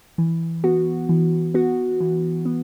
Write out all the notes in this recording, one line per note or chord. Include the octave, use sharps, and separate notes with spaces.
E3
B3 F#4
E3
B3 F#4
E3
B3